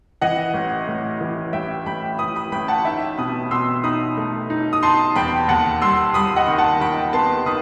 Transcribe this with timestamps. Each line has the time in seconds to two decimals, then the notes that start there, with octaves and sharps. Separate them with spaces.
0.21 E3 D#5 F#5
0.54 A1
0.88 A2
1.21 E3
1.53 A1 E5 G5
1.86 A1 G5 B5
2.18 E3 B5 D#6
2.36 B5 D#6
2.52 A1 G5 B5
2.68 F#5 A5
2.85 D#4 E5 G5
3.18 B2 B5 D#6
3.51 B2 C6 E6
3.83 D#4 B5 D#6
4.17 A3
4.50 D#4
4.73 D#6
4.83 D#4 A5 C6
5.15 E2 G5 B5
5.48 D#2 F#5 A5
5.81 G3 C6 E6
6.14 G3 B5 D#6
6.36 D#5 F#5
6.47 D#3
6.58 F#5 A5
6.81 D#3 G5 B5
7.13 B3 A5 C6
7.46 D#3 B5 D#6